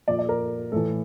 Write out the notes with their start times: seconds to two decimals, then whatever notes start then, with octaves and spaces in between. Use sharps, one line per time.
0.08 A#2 F3 D5
0.19 D5
0.29 A#4
0.72 A2 E3 A4